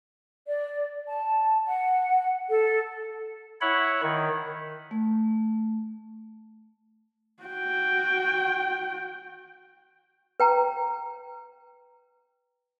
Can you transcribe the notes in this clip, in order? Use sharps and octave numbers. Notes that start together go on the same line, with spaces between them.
D5
A5
F#5
A4
E4 C#5 F#5 B5
D#3
A3
F#4 G5
B4 G5 A#5